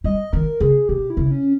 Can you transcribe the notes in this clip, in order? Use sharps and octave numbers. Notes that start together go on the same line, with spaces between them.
G3 D#5
D#3 A#4
C#3 G#4
B2 G4
E4
C#3
C#4